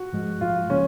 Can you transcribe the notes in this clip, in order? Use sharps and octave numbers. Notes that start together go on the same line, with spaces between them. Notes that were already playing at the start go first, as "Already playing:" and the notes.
Already playing: F#4
G#2 F3 G#3
G#2 F3 G#3 F4
C#3 F3 A#3 C#4